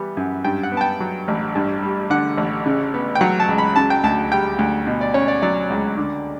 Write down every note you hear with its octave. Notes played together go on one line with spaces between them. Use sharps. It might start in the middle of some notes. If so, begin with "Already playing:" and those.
Already playing: E3 G3 B3
F#2
G2 G5
F#5
B3
A5
G5
F#3
A1
G2
G3
D3 F#5
A1
C#3
B3
G5
F#3 F#5
A5
C#2
B5
C#3 A5
G5
D2 A5
G3 G5
D2
B2
D5
C#4 C#5
D5
F#3 D5
C#2
D3